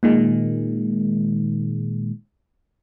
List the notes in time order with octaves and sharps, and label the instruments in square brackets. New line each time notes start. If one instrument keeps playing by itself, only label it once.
[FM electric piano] A#2 D#3 G#3